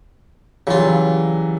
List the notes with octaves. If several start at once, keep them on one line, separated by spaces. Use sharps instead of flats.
C#3 E3 F#3 G3 F4